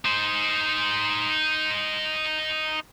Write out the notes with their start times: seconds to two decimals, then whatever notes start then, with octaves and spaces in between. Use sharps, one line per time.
0.05 D#4 C5